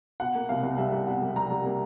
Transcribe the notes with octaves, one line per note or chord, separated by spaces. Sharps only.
B2 F#5
A#3
C2 F5
C2
G3 E5
G3
B2 F#5
G3
G3 A#5
G3
A#3